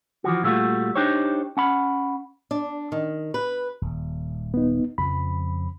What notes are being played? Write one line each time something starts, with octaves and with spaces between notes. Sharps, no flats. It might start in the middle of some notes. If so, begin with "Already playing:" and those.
E3 F3 F#4
A#2 G3 A3 F4 F#4
D4 D#4 G4 C5 C#5
C#4 F#5 B5
D4
D#3
B4
D#1
B3 D#4
F2 C#3 F3 B5